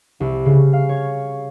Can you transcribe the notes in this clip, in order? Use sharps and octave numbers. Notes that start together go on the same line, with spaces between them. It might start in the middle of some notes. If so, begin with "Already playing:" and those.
C2
C#3
F5
C#5